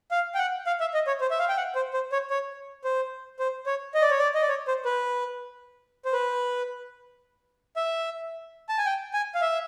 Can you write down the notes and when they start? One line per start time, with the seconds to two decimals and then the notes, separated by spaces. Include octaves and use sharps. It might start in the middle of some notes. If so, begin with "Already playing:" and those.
0.11 F5
0.35 G5
0.38 F#5
0.67 F5
0.80 E5
0.94 D#5
1.07 C#5
1.21 C5
1.31 E5
1.39 F5
1.49 G5
1.57 F#5
1.75 C5
1.94 C5
2.12 C#5
2.30 C#5
2.84 C5
3.39 C5
3.66 C#5
3.94 D#5
4.02 D5
4.11 C#5
4.19 D5
4.35 D#5
4.42 D5
4.49 C#5
4.68 C5
4.85 B4
6.05 C5
6.13 B4
7.76 E5
8.69 A5
8.78 G#5
8.86 G5
9.13 G#5
9.35 F5
9.42 E5